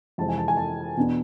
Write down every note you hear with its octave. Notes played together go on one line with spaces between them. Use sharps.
F2 C3 E3 G#3 C4 A5
G#5
A5
G#5
A5
E2 B2 B3 D4